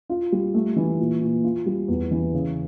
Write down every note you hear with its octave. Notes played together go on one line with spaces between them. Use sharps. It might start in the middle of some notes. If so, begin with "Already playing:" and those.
F4
G3
A3
E3
A#2
A#2
F4
G3
E2
E3
C#3